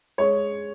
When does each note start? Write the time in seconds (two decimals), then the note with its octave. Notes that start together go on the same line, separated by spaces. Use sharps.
0.18 G#3 C#5